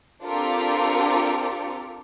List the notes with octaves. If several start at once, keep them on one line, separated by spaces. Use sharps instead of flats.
C4 D4 F4 G4 A4 A#4